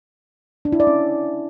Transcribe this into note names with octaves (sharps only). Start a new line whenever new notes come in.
D4
E4
D5
C#4